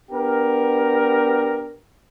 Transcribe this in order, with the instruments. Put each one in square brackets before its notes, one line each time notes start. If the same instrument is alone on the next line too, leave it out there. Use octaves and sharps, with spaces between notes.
[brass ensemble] B3 D4 G4 A#4